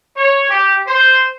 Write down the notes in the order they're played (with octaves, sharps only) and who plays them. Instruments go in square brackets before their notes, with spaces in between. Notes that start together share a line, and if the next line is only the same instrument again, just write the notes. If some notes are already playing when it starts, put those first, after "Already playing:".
[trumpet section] C#5
G4
C5